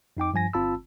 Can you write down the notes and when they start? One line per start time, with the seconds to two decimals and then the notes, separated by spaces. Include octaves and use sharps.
0.17 F2 D#4 G5 D6
0.34 G2 F3 G#5 A#6
0.53 G1 C4 F4 A5 B5 E6